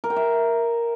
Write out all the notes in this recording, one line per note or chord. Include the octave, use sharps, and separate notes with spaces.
A#4
G5
E5